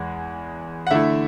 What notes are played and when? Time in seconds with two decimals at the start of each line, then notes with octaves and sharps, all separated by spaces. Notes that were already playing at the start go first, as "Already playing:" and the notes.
Already playing: E2 G#3 F#5
0.87 F#5
0.91 D3 A3 E4 E5